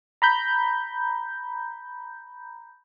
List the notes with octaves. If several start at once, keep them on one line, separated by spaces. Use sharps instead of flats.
A#5 B5 G6